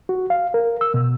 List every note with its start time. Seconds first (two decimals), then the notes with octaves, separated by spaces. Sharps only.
0.09 F#4
0.30 F5
0.54 A#4
0.81 E6
0.94 B2